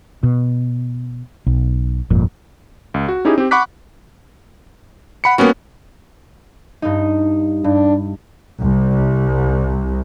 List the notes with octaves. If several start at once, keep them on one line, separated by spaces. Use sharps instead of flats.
B2
B1
G1 F2 A#2
C#2
F#4
C#4 D#4 E4 G4 G#4
C4 G4
F#5 B5 C#6 D6 F#6 B6
F#5 B5 C#7
G3 A#3 B3 C#4 F#4
G2 D#4
G2 D4
C2